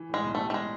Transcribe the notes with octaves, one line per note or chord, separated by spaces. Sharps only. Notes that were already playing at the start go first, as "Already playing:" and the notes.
Already playing: E3
A2 G#3
B1
G3 A3
A3
A2 G#3